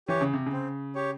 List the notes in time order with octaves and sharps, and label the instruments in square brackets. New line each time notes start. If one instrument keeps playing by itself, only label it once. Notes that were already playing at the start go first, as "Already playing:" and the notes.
[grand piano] E3 [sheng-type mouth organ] G4 C#5
[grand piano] C#3
C3
C#3
[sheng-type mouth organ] C4
G4 C#5